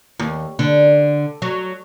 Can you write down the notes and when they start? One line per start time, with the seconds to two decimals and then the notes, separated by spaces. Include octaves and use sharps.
0.19 D#2
0.59 D3
1.42 F#3